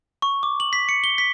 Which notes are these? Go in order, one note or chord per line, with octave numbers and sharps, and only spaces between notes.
C#6
D6
F#7
B6
C#7
G7
B6